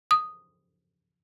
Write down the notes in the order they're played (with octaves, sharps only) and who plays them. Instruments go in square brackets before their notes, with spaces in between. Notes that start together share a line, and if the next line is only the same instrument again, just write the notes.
[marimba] D#6